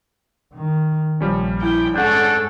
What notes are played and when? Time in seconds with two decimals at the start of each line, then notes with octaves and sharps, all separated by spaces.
0.54 D#3
1.21 A#1 F3 G3 C#4
1.60 E4 G5
1.95 G#2 C#4 D4 A4 F#5 G6